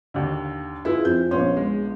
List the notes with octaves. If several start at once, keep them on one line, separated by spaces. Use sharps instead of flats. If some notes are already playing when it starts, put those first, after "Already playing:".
D#2 D3
E4 F4 G#4 B4
F2 F4 G6
A#1 B3 C#4 C6
G#3